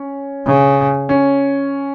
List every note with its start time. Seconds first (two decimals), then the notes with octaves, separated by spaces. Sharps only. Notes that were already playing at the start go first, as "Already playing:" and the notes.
Already playing: C#4
0.46 C#3
1.09 C#4